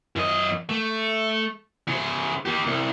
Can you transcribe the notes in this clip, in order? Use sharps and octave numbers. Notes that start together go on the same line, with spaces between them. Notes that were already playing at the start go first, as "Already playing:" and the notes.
F#2 D#5
A3
C#3 C5
A#3 G4
C2